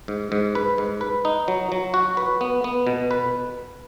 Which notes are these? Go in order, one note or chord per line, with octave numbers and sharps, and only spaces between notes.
G#2
G#2
B4
G#2
B4
D#4
F#3
F#3
F#4
B4
B3
B3
B2
B4